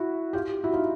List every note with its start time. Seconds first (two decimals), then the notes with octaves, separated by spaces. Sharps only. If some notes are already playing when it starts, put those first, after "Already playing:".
Already playing: E4 F#4
0.33 F4 G4
0.64 E4 F#4
0.74 D#4 F4